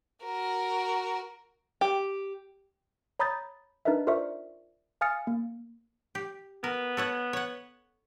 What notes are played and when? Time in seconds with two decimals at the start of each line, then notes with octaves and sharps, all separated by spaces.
0.23 F#4 A#4
1.81 G4
3.19 C#5 A#5 B5 D#6 G6 A6
3.85 D4 D#4 A#4 B4 D#5 E5
4.07 F4 A#4 C5 D5 E5 C#6
5.01 F5 G#5 D#6 F6 A6 C#7
5.27 A#3
6.15 G4
6.64 B3 A#4
6.97 A4 C#5 F#5
7.33 C#5 F#5